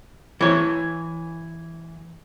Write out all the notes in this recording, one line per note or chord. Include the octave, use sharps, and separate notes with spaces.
E3 C#5